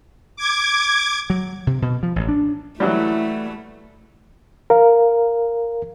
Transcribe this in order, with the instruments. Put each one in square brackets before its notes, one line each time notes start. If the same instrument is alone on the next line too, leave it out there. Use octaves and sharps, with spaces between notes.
[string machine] D6 G#6
[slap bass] F#3
C3
B2
F3
A1
D4
[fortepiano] E3 F#3 G3 [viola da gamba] A3 [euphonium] E4
[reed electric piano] A#4 F5